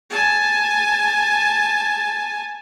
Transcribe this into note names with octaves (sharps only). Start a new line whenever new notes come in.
G#5 A5